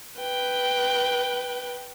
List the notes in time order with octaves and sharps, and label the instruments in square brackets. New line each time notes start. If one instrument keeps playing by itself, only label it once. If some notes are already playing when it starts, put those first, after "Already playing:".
[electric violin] B4 G5